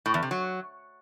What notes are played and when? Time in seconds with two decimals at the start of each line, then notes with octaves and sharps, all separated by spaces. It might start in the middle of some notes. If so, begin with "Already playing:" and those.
0.06 A2
0.14 E2
0.22 C3
0.31 F#3